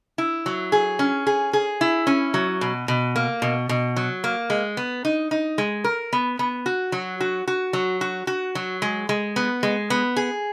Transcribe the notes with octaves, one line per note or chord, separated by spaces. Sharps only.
E4
F#3
G#4
C#4
G#4
G#4
E4
C#4
F#3
B2
B2
A#3
B2
B2
F#3
A#3
G#3
B3
D#4
D#4
G#3
A#4
B3
B3
F#4
F#3
F#4
F#4
F#3
F#4
F#4
F#3
G#3
G#3
B3
G#3
B3
G#4